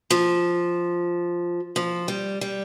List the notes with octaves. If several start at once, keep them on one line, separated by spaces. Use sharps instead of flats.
F3
F3
G3
G3